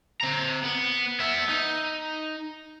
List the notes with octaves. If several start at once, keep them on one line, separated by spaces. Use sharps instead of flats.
C4 A#5
B3
B3 E5
D#4